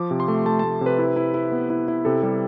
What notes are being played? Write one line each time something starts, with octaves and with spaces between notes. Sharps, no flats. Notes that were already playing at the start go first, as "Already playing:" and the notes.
Already playing: F3 D6
C3
C6
A3
A3 A5
A3 A5
C3
B4
E4
E4
E4
B3
E4
E4
C3 A4
G3